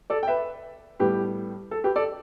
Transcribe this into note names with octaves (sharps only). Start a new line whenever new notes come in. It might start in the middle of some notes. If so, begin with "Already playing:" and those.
A4 D5
G5
B4 E5
A2 G3 B3 G4 B4
A4
G4 B4
A4 D5